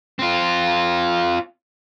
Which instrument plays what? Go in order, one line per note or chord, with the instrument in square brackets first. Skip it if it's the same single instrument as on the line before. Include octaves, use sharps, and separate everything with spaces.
[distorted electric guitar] C4 F4